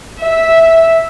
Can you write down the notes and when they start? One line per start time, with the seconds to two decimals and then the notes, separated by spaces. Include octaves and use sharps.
0.20 E5